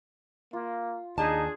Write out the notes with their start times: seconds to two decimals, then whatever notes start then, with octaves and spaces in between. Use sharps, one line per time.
0.53 A#3 F4
1.18 D#2 D4 D#4 G#4 A5